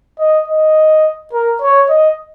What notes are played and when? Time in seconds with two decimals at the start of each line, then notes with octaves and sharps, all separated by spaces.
0.20 D#5
0.48 D#5
1.33 A#4
1.62 C#5
1.90 D#5